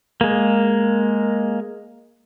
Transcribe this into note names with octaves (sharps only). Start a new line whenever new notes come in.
G#3 A#3